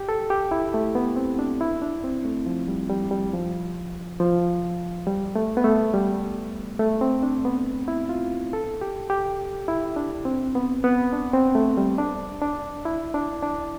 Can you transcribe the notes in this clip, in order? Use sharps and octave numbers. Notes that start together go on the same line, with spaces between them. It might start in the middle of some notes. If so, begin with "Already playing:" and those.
Already playing: G4
A4
G4
E4
A3
B3
C4
D4
E4
D4
C4
A3
F3
G3
G3
G3
F3
F3
G3
A3
B3
A3
G3
A3
C4
D4
B3
E4
F4
A4
G4
G4
E4
D4
C4
B3
B3
D4
C4
A3
G3
D4
D4
E4
D4
D4